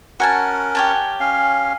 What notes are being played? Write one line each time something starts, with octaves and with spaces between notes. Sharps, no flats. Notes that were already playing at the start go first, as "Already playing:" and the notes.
C#4 F#4 A#4 F#5 G#5 A5
G4 C#5 A5
C#4 F5